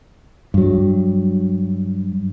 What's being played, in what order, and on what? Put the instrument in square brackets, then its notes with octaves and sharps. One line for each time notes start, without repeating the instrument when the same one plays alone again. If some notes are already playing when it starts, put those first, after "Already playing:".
[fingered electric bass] G2 F#3